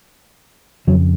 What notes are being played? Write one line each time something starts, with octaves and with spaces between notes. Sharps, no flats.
F2 C#3 F#3